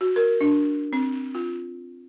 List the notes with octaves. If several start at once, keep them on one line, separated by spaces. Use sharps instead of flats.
F#4
A#4
D4
C4
F4